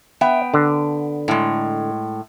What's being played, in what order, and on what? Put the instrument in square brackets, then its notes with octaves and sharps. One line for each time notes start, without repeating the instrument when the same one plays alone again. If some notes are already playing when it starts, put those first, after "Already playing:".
[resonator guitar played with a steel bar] B3 G5 [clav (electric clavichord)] E5
[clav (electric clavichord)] D3
[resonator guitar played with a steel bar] A2 G#3